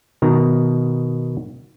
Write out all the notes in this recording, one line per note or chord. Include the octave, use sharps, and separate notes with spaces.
B2 D#3 A#5